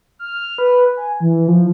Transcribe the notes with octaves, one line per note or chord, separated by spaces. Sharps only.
F6
B4
G#5
E3
F3